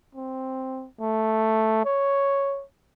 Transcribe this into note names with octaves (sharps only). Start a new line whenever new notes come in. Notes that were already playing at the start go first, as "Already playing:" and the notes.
C4
A3
C#5